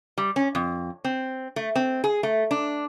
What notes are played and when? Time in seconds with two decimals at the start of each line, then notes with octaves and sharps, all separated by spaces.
0.18 G3
0.36 C#4
0.55 F2
1.04 C4
1.56 A3
1.76 C4
2.04 G#4
2.23 A3
2.51 D4